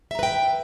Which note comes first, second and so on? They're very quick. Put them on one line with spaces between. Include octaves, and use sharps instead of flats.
E5 A#5 B4 G5